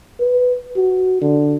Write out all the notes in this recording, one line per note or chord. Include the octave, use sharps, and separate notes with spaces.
B4
F#4
D3